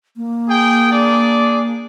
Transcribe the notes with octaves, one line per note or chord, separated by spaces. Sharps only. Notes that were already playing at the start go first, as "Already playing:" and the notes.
A#3
G#4 G5
D4 G#4 D5